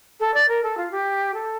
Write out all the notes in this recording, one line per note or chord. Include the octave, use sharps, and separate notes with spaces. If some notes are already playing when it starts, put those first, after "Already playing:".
A4
D5
A#4
A4
F4
G4
A4